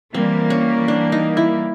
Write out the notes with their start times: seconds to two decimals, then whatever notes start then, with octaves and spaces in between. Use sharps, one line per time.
0.14 E3 G3 A#3 C4
0.50 C#4
0.88 D4
1.12 D#4
1.37 E4